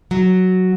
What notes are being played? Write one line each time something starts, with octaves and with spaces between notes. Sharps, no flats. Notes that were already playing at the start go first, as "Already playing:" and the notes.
F#3